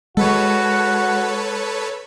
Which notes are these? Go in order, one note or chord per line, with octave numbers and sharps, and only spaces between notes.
G#3 F#4 A4 B4 C#5